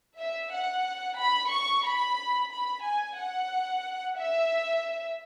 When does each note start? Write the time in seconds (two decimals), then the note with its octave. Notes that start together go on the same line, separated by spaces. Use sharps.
0.18 E5
0.51 F#5
1.18 B5
1.51 C#6
1.85 B5
2.51 B5
2.84 G#5
3.17 F#5
4.17 E5